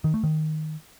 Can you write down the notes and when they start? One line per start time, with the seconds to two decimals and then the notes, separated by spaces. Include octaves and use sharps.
0.04 D#3
0.14 A3
0.23 D#3